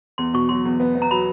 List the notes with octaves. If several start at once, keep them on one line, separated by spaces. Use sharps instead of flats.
E2 C6
B2 C#6
F#3 C6
E2
B3
B3
A#5
F#3 B5